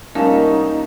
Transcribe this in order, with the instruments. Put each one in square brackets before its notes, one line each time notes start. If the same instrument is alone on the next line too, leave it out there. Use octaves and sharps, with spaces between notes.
[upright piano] C2 C#4 A5 [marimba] A#3 A#4 F5 [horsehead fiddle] D#4